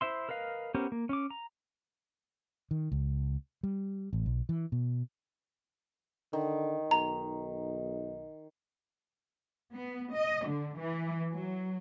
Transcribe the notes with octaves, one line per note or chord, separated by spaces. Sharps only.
E4 C5 E5 C6
A#4 B4 D#5 F5
B3 C#4 G4 A#4 C5
A#3
C#4 D6
A#5
D#3
C#2
G3
A1
B1
E3
B2
D3 D#3
B1 A#5
B3
D#5
D3
E3
F#3